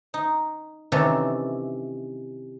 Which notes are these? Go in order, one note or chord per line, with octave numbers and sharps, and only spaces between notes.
D#4
C3 D#3 E3 C#4 G4 A4